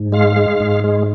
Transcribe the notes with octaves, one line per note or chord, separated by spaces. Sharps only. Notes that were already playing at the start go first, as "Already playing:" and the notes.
Already playing: G#2
G#3 F5
G#3
G#2
G#3